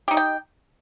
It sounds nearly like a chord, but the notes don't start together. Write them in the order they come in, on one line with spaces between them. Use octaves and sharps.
G4 D#4 D#5 G5